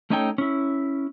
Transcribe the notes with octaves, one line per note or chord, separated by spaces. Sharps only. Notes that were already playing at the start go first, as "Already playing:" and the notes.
A3 C#4 D#4 A4 C#5 G5
C#4 E4